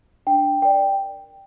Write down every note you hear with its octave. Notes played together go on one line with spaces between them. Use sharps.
D4 G5
A#4 D5 G5